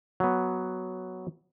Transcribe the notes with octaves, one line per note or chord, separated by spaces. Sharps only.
F#3 B3